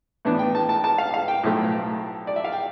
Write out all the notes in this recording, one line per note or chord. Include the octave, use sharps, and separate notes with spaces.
A2 E3 B3 D4
G5
A5
A5
A5
F5
F5
G5
B1 A2 F3 A3
D5
E5
F5
G5